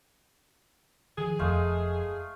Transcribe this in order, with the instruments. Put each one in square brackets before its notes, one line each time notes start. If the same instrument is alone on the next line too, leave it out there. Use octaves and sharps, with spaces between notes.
[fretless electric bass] D#3 F3 [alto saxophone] G#4
[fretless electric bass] F1 F2 [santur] G#3 A3 F5